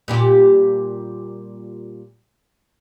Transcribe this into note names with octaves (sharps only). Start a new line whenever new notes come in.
A#2 G3 G4